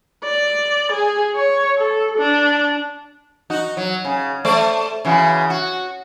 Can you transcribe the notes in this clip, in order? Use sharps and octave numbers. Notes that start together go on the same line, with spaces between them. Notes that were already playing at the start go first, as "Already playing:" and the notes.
D5
G#4
C#5
A4
D4
D#4 F#4
F#3
C#3
A3 C5 D5
C#3 E3 F#4
F#4